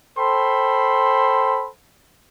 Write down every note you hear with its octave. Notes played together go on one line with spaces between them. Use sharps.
A4 C5 G5 B5 C6